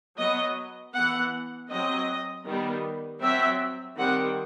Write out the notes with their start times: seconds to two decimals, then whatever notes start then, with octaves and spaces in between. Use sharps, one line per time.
0.18 F#3 B3 D#5
0.94 E3 B3 F#5
1.69 F#3 C4 D#5
2.45 D#3 G3 B3
3.21 F#3 C4 E5
3.97 D#3 G3 C4 F#5